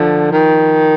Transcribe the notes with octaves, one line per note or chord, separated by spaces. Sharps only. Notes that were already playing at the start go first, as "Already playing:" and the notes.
Already playing: D3 F3
D#3